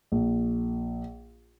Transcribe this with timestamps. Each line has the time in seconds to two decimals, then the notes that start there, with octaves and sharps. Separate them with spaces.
0.12 A#1